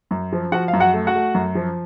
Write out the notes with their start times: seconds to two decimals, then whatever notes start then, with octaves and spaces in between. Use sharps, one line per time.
0.11 F#2
0.32 F3
0.52 F3 F#4 F#5
0.68 F5
0.73 F#2
0.80 F#4 F#5
0.93 A3
1.07 F#4 F#5
1.15 A3
1.35 F#2
1.55 F3